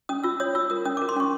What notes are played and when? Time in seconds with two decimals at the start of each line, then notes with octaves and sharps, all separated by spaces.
0.09 C#4 D#6
0.24 F4 E6
0.40 C#5 D#6
0.55 F4 E6
0.70 A#4 D#6
0.85 C#4 D#6
0.97 A#4 D6
1.09 C6
1.17 C#4 C#6